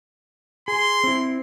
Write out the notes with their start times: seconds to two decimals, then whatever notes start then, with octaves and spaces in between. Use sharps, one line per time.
0.68 G#4 C6
1.04 C4 E4